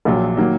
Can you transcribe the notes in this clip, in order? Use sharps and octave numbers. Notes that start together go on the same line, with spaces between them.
A#1 A#2 F#3
D#3 F#3 A#3